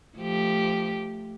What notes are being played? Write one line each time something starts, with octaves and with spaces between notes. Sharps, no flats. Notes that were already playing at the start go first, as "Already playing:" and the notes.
F3 A3 G4